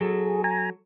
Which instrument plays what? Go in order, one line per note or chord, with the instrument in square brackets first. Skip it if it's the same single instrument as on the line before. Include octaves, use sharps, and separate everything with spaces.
[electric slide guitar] F#3 A4 [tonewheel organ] G#4
[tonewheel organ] G#5 A#5